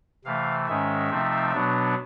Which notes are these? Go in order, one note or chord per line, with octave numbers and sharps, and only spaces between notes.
C3 E3 A3 F5
G#2 D#3 G#3 C#4 E5
C3 F3 A3 C4 D#4
B2 F#3 B3 D4